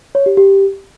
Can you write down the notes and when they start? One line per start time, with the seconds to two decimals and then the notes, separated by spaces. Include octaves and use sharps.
0.15 C#5
0.26 G4
0.37 G4